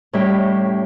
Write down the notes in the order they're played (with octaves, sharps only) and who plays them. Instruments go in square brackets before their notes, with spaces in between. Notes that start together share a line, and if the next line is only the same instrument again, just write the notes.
[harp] A2 G3 C#4 E4 G4 C#5